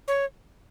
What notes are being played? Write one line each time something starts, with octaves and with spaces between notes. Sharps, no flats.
C#5